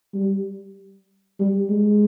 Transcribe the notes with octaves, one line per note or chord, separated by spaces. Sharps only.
G3
G3
G#3